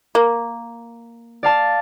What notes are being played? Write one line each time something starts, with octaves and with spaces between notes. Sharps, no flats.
A#3
D5 F5 A5